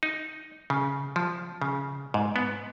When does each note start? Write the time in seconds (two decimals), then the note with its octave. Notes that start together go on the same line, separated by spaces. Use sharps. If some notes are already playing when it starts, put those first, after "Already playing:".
0.03 D#4
0.70 C#3
1.16 F3
1.62 C#3
2.14 G#2
2.36 B3